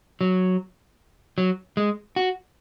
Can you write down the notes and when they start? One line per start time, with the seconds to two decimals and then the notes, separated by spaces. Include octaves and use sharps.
0.21 F#3
1.38 F#3
1.77 G#3
2.16 F#4